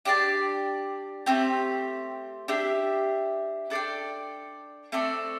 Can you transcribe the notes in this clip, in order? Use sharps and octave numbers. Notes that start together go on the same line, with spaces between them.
D4 G4 D5 A5
A3 C4 G4
D4 G4 E5
D4 A4 D5 G5
A3 C4 A4 D5